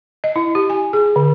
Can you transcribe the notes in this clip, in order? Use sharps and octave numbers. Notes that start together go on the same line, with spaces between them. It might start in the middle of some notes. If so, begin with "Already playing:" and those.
D#5
E4
G4
G#5
G#4
D3